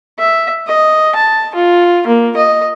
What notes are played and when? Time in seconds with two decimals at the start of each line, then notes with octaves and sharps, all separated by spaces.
0.19 E5
0.67 D#5
1.15 A5
1.55 F4
2.07 A#3
2.36 D#5